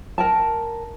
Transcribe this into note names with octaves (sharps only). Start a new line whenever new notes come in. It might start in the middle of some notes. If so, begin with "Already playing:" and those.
A#4 G5 A5